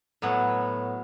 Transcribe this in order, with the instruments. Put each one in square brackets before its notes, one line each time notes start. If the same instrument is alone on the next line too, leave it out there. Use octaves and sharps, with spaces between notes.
[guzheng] A2 F#3 B3